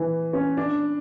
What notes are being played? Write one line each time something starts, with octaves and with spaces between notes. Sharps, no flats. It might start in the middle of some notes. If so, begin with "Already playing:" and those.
Already playing: E3
C#4
D4